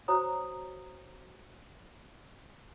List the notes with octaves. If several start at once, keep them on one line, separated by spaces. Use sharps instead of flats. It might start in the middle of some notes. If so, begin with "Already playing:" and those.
F#4 C5 C#5 A#5 D#6